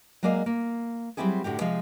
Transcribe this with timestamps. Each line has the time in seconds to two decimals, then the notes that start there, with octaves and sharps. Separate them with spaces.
0.23 F#3 G#3 A#3 D5 D#5 F5
0.46 A#3
1.17 F#3 G3 C4 E4 G4 G#4
1.44 A2 D3 F#4 G4
1.60 C3 F3 G#3 F5